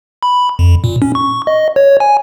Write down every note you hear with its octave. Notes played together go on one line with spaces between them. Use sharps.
B5
F2
A#2
C#4
C#6
D#5
C#5
G#5